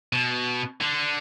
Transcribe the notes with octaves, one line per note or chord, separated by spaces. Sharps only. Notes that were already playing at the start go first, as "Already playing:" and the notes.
B2
D3